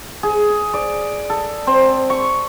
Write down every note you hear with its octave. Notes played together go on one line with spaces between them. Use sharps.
G#4
D5
A4
C4
C#6